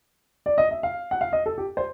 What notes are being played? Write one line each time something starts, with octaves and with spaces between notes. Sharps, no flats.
D5
D#5
E5
F5
F#5
F5
D#5
A4
G4
C5